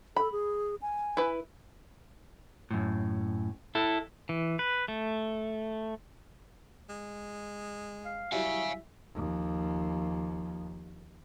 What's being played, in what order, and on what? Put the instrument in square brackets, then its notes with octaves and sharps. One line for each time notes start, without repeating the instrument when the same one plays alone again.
[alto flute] A4 [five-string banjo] B5
[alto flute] G#4
G#5
[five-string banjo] E4 B4
[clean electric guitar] F#2 A2
E4 A4
[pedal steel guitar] E3
B4
A3
[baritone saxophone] G#3
[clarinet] F5
[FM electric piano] F#3 G3 E4 [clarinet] E5 [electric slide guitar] F5 G#5
[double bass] D#2 F3